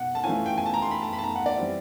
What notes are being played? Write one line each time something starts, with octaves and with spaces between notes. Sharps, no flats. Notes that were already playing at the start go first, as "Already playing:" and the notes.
Already playing: B2 F#5
A5
E3 A3 C#4 F4 G#5
G5
G#5
A5
A#5
C6
B5
A5
B5
A5
A#5
F#5
D5
E3 G3 C4 E4